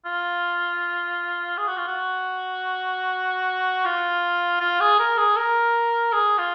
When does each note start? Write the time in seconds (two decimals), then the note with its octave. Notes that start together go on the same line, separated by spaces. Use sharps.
0.05 F4
1.57 G#4
1.68 F#4
1.77 F4
1.88 F#4
3.85 F4
4.60 F4
4.80 G#4
4.99 A#4
5.18 G#4
5.37 A#4
6.13 G#4
6.38 F4